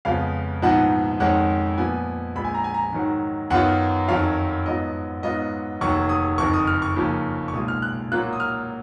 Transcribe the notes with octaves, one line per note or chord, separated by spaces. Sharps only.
F2 C#3 G#3 B3 F4 F5
A#1 G#2 F3 B3 D#4 F#5
F2 D#3 G#3 C#4 F#5
A#2 F3 B3 G#5
A#1 A#2 G#3 B5
G#5
A#5
G#5
A#5
G#2 D#3 F#3
F#2 D#3 F#3 B3 F4 F#5
F2 D#3 F#3 C#4 F4 F5
G#2 F#3 B3 F4 D#5
G#2 F#3 B3 F4 D#5
F1 D#2 D#3 F#3 C#6
D#6
F#1 F2 D#3 C#6
D#6
F6
C#6
D#2 C#3 F3 A#3
C#6
B1 A#2 G#3 D#6
F6
F#6
A#2 F#3 A#3 F4 F#6
D#6
F6